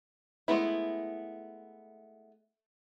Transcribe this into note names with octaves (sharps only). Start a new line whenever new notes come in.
G#3 A3 B3 E4